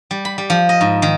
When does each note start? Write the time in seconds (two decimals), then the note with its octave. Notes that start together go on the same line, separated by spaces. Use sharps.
0.11 G3
0.25 B5
0.38 G3
0.50 F3
0.69 D#5
0.81 G#2
1.02 D#3